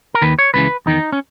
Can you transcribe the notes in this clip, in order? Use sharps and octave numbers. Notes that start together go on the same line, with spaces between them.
A#4
D#2 D#3 B4
C#5
C#2 C#3 E3 B4
E2 D#3 D#4
C#4